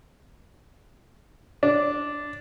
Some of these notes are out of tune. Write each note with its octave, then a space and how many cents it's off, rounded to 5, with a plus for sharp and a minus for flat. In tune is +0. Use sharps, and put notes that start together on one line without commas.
D4 -5